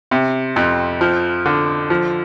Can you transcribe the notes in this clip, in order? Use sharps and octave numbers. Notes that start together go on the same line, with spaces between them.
C3
F2
F3
D3
F3